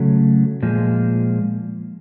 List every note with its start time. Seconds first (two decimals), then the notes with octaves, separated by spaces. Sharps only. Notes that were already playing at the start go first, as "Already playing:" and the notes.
Already playing: C#3 F#3 A3
0.63 A#2 F3 G#3